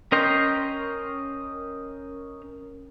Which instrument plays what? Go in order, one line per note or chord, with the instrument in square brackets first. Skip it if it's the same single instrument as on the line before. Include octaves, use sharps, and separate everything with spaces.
[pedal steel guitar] C#4 A#4 D#5 G5 C6